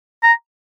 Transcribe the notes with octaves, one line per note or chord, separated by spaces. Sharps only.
A#5